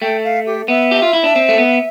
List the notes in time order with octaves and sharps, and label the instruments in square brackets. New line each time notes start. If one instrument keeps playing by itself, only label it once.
[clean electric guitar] A3 [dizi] G5
[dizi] F5
G4
[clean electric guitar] B3 [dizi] E5
[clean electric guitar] G4
F4
E4
D4
C4
A3
B3